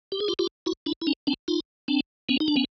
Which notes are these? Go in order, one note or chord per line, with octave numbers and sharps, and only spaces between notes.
G4
G#4
F4 G4
F4 G4
E4 F#4
D4 E4
E4
C#4 D#4
C4 D4
D#4 F4
C4 D4
B3 C#4
D#4
D4
B3 C#4